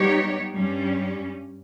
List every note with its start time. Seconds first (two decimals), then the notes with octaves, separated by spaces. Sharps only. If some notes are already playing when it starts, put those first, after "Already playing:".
Already playing: G3 B3 D#4 G4 C#5
0.53 G2 G3 C#4